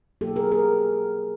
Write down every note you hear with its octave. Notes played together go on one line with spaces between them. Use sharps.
B2 F#3 A#3 G4 A4
G#4 A#4
G#4 A#4